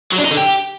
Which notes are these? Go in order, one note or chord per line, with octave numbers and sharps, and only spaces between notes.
F#3
D4
D#4
D3
G4